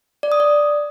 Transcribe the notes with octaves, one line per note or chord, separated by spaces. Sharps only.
D5
D#6
D5